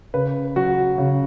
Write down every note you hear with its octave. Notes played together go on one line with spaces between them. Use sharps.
C#3 B4
F#3 F#4
C#3